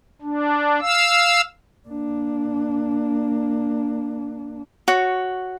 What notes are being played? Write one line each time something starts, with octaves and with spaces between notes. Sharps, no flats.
D4
F5 E6
A#3 D4
F#4 C#5